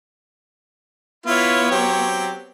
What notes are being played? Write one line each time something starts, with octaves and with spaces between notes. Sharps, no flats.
B3 E4 F4 C#5
F#3 C4 G4